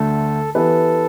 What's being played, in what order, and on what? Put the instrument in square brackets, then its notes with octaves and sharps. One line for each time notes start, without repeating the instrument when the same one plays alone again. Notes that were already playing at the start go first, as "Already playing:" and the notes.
Already playing: [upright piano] D2 D3 A3 [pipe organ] A4
[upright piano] E3 B3 G4 B4 [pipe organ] A4